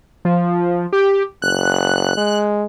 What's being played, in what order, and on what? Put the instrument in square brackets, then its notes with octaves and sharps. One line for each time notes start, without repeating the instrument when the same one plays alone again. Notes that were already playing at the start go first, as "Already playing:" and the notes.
[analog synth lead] F3
G4
[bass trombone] F#1 [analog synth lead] F#6
[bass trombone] G#3